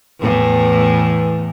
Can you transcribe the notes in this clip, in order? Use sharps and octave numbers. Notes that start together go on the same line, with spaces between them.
E2 A2 E3